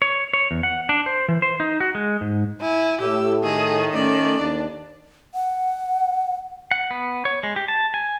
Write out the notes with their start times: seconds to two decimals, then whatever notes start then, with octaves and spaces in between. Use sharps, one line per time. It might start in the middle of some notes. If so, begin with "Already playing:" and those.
0.02 C#5
0.34 C#5
0.51 E2
0.63 F#5
0.89 D4
1.06 C5
1.29 E3
1.42 C5
1.60 D#4
1.80 F#4
1.95 G#3
2.21 G#2
2.61 E4 G#5
3.01 A2 G4 E6
3.43 D#3 G#4
3.94 A3 C#4 D5
4.40 D#2 D4
5.35 F#5
6.71 F#5
6.91 B3
7.25 C#5
7.43 G#3
7.56 G4
7.68 A5
7.94 G#5